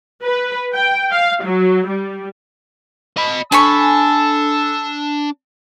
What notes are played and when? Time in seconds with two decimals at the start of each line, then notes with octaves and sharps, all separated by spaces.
0.23 B4
0.74 G5
1.12 F5
1.44 F#3
1.88 G3
3.17 D#5 B5
3.52 D4 G#5 A5 B5 C#6 E6